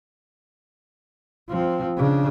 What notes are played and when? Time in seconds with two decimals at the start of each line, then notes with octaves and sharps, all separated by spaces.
1.50 F3 C4
1.98 C#3 D4